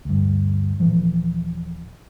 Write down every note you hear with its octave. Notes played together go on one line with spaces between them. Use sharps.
D2 G2
D#1 A#2 E3 F3